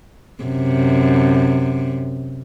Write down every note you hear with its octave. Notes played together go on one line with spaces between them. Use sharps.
F#2 C3